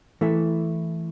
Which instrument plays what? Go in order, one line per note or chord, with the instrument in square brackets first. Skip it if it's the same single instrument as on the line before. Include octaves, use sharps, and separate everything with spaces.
[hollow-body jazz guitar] E3 A3 E4 A4 E5